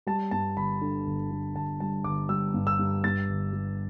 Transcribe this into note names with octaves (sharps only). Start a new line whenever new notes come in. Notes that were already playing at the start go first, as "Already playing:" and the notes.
G3 A5
G2 A5
G1 B5
D3
G1
D3
G1 A5
G3 A5
G1 D6
G3 E6
G2
E6
G2
G2 A6
G1
G3